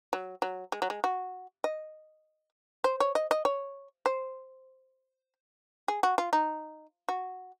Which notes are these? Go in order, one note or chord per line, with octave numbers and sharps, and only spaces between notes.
F#3
F#3
G#3
F#3
G#3
F#4
D#5
C5
C#5
D#5
D#5
C#5
C5
G#4
F#4
F4
D#4
F#4